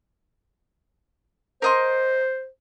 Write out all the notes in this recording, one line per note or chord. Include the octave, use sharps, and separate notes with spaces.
A#4 C5 D#5 C6